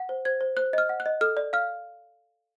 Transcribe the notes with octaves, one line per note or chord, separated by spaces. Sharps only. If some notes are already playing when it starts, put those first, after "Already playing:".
Already playing: F#5
C5
C5 G#6
C5
C5 F#6
D#5 F6
F#5
F#6
D#5
A4 F6
D5
F5 F6